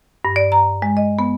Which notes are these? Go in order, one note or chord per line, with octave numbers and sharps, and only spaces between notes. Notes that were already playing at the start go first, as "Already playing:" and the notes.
G2
D5
A#5
G#3
D#5
B3